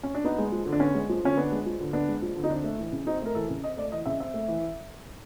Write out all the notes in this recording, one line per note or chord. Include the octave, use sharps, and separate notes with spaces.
C#4
D4
B3 D#4
G#3
F3
D3
D4
B3 C#4
G#3
F3
D3 C#4
B3 D4
G#3
F3
D3
B3 D4
G#3
F3
D3
D#4
C4 D4
A3
E3
C#3
C4 D#4
A3 A#4
E3 A4
C#3
C4 D#5
A3 D5
E3 D#5
C#3 E5
C4 E5
A3
E3